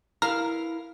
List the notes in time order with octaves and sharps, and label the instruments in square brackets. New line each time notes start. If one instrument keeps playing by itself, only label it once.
[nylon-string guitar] E4 A#4 F5 [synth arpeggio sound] A#5 F6